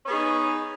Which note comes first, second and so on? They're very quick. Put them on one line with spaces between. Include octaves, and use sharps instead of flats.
C#4 B3 G#4 D#4